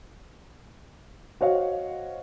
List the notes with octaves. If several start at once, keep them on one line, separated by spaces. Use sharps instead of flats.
F#4 C5 C#5 D#5 F5 F#5